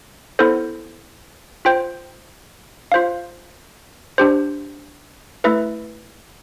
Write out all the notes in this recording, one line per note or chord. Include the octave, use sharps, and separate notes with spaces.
B3 E4 A4 C5
F4 C5 G5
F4 C5 F5
D4 G4 C5
A3 E4 B4 E5